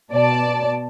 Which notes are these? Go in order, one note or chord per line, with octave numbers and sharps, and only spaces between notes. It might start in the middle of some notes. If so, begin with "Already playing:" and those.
B2 D5 A5